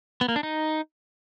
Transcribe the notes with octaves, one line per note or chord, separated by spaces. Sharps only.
B3
A#3
D4
D#4